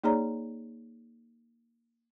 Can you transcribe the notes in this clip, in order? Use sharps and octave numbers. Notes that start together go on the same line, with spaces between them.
A#3 D#4 G#4 C#5 D5 A#5